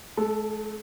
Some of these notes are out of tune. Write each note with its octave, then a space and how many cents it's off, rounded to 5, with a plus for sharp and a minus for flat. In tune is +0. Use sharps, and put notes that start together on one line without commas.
G#3 +45 A4 +0